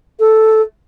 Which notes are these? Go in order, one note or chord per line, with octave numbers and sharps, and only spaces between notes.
A4